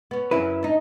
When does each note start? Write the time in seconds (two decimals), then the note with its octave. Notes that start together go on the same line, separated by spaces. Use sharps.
0.11 B3 C#4
0.31 F#2 C#3 C#4 E4 B4
0.63 D4 D#4